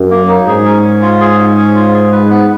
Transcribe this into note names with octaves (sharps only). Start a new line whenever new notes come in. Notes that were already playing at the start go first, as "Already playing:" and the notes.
Already playing: F#2
A#3
D#4
G#2 G#4
C#4
C#4
F4
G#4
C#4
C#4
F4
G#4
B4
B3